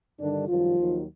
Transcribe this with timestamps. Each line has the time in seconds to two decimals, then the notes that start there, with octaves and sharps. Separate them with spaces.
0.20 G2 D3 D#3 G3 D4
0.48 F#2 D#3 F3 G3 F4
0.76 D#2 D#3 F#3